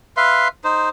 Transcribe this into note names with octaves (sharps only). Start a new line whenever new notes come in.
B4 E5 F5 C6
D#4 C5